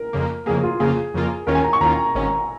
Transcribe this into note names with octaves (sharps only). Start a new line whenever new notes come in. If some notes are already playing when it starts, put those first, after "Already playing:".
Already playing: A#4
F2 C#3 A#3
F2 C#3 A#3 G#4
F4
F2 C#3 A#3 F4 G#4
F2 C#3 A#3 F4
D#2 D#3 C#4 F4 A#4
G#5
A#5
C#6
D#2 D#3 C#4 F4 A#5
G#1 G#2 D#3 C#4